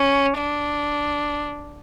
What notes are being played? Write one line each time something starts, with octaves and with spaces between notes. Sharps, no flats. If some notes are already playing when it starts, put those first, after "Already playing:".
Already playing: C#4
D4